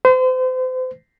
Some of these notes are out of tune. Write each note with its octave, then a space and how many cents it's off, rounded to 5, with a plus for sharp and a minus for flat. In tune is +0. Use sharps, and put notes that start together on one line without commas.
C5 -35